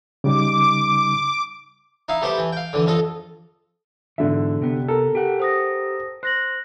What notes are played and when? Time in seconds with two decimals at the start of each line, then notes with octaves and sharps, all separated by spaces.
0.24 C#3 G3 D#4 D6
2.08 D#4 E4 F5
2.22 G3 A3 B3 G4 C5
2.38 E3
2.52 F5 G5
2.73 D3 E3
2.86 F2 F4 A4 D#5
4.18 G#2 B2 D3 E3 E5
4.62 C3 B3
4.88 A4 A#4
5.15 G4 F#5
5.40 C5 D#6 A#6
6.23 C5 F#6 A#6 F#7